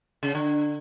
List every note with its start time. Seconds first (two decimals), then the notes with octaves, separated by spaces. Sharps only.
0.23 C#3
0.35 D3